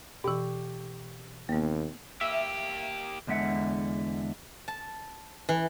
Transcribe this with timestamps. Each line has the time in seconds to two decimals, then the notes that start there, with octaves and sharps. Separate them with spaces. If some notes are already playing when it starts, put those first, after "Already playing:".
0.24 B2 E3 G4 C#6
1.49 D#2 A#3 B3
2.21 A#3 G4 E5
3.27 E2 D3 G#3 E5 F#5
4.68 A5
5.49 E3